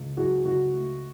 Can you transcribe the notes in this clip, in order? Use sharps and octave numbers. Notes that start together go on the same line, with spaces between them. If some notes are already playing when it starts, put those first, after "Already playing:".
Already playing: C#2
F#3 F#4 G#4
C#2 F#4
A3